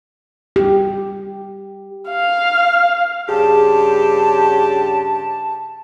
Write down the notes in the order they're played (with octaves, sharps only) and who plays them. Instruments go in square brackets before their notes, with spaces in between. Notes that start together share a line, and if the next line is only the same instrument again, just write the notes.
[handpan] G4
[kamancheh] F5
[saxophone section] G2 C#3 G4 [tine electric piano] G#4 [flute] A5